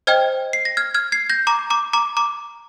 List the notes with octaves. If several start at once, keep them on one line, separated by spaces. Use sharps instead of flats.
C5 D#5 G5 F6 G#6
C7
A#6
F6 G#6
F6 G#6
G#6 C7
G6 A#6
A#5 D6
A#5 D6
A#5 D6
A#5 D6